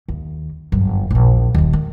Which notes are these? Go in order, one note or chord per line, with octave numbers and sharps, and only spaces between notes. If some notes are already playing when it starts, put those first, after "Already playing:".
D#2
G1 F#2
A#1 E2
D#1 D#2
D#3